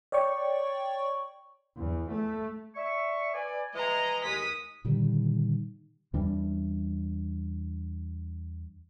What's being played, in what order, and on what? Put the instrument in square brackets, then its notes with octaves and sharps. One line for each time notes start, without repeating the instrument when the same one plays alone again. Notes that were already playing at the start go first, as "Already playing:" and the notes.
[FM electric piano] C#5 D5 G5 C#6
[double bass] E2
A3
[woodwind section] D5 E5 C#6
B4 D5 G#5
[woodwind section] E3 G#3 [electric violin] D#5 A#5
[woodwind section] D#2 G#3 [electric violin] D#6 B6
[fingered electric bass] A#2 D3 D#3 G3
E2 E3 G3 D4